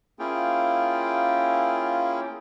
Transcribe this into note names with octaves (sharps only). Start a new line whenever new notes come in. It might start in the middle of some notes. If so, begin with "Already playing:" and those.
A#3 C#4 E4 F4 G#4 G5